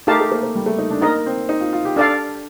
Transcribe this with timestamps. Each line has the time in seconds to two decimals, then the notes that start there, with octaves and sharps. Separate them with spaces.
0.07 A3 D#4 G4 A#4 F5 A5
0.20 A3
0.31 A#3
0.43 A#3
0.55 G3
0.66 A3
0.78 D#4
0.91 D4
1.02 A#3 D#4 A#4 D#5
1.26 C4
1.49 D#4
1.60 F4
1.73 F4
1.85 G4
1.96 D4 A4 D5 F5